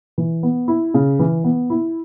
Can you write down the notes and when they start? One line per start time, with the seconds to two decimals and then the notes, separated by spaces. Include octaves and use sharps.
0.18 E3
0.43 B3
0.68 E4
0.94 C#3
1.19 E3
1.44 B3
1.70 E4